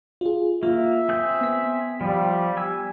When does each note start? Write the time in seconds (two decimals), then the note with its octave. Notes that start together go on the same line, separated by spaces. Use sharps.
0.21 F4 G#4
0.63 A#3 F4 E5
1.09 C4 G#4 G6
1.41 B3 B6
2.01 F3 G3
2.57 G#5 E6